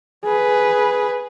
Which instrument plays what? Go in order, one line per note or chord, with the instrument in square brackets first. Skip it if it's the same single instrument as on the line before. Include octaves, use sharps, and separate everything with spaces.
[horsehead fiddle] G#4 B4